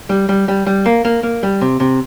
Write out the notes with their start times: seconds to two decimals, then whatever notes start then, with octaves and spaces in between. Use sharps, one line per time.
0.09 G3
0.29 G3
0.48 G3
0.66 G3
0.86 A#3
1.05 A#3
1.23 A#3
1.43 G3
1.61 C3
1.80 C3